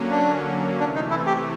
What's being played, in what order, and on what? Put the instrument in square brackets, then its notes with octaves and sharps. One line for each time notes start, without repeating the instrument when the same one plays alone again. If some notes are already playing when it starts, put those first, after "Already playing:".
Already playing: [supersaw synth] D3 F#3 A#3 C#4
[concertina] D4
[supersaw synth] C3 E3 A3 [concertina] D4
[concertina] D#4
E4
G4